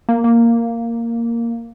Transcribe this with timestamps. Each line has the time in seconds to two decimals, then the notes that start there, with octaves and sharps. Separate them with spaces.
0.09 A#3
0.24 A#3